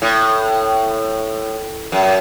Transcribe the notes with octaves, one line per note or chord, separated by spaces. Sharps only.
A2
F#2